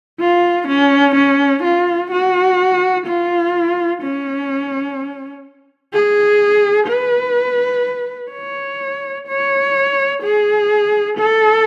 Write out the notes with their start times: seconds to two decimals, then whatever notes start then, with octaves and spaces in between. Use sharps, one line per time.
0.20 F4
0.68 C#4
1.16 C#4
1.63 F4
2.12 F#4
3.07 F4
4.02 C#4
5.93 G#4
6.88 B4
8.32 C#5
9.27 C#5
10.23 G#4
11.18 A4